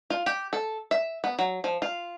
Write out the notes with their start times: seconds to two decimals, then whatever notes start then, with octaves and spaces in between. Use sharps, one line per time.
0.10 F4
0.26 G4
0.53 A4
0.91 E5
1.24 B3
1.39 F#3
1.64 F3
1.82 F4